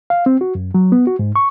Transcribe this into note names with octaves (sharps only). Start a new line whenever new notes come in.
F5
C4
F#4
F#2
F#3
B3
F#4
G#2
C#6